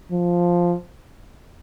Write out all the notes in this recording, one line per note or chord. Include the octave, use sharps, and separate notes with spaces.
F3